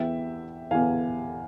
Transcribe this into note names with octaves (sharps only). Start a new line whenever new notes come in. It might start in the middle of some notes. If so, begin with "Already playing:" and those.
Already playing: E2 E3 E5 G5
E2 E3 F5 G#5